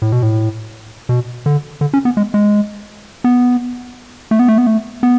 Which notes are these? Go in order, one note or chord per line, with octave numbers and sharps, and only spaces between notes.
A2
B2
A2
B2
D3
D3
C#4
B3
G#3
G#3
B3
A3
B3
A3
B3
A3
B3